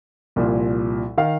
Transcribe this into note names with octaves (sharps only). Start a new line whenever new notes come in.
C2 A#2 F3
D#3 F5